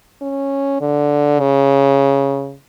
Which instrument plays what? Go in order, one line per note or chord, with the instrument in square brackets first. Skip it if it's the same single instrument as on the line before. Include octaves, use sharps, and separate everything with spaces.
[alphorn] C#4
D3
C#3